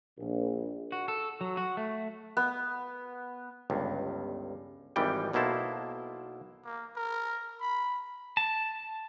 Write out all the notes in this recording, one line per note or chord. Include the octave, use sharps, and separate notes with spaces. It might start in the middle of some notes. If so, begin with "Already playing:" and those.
A#1
F#4
A4
F#3
F#4
A3
B3
G1 C#2 G2
G#1 D#3 E3 G3 G5
B1 B2 A#3 E4 C5 A5
A#3
A#4
B5
A5